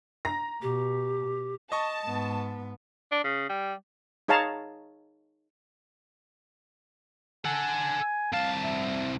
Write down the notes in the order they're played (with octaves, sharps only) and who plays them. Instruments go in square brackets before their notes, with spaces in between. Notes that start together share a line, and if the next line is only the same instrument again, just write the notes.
[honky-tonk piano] A#5 A#6
[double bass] B2 [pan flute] G4
[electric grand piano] D#5 C#6 [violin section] A5
[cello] G#2 B3
[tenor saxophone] D4
C#3
G3
[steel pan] D#4 G#4 C#5 F5 A5 A#5
[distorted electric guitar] A4 F#5 [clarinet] G#5
[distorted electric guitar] C2 A5 [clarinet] F5
[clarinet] E5